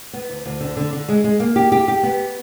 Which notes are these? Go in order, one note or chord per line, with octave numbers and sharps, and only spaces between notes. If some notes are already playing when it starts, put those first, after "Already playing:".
B3
D2
D2
D3
D3
D3
G#3
G#3
A#3
G4
G4
G4
B3